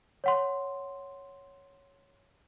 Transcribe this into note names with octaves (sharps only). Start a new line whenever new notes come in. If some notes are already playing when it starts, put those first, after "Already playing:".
C#5 F#5 C6